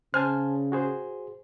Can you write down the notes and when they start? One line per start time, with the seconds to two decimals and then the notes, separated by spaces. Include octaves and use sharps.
0.14 C#3 C5 G#5 A5 F6
0.72 F#4 G#4 C5